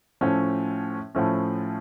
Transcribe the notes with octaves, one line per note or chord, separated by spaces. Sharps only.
A2 F3 A3 C#4
A2 F3 A3 C#4